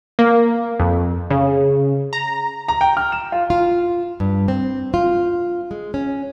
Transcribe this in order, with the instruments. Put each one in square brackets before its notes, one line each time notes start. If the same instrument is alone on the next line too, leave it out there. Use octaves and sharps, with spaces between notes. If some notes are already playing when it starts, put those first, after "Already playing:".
[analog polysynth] A#3
F2
C#3
A#5
[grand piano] A#5
G5
F6
E7
F4
[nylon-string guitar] F4
G2
C4
F4
G#3
C#4